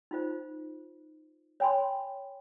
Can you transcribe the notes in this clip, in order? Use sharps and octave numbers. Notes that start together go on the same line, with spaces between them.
D#4 F4 C5
C#5 G5 G#5 B5 C6